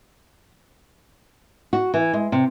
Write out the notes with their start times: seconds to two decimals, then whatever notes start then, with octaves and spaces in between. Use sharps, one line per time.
1.73 F#4
1.94 E3
2.13 G#3
2.32 C3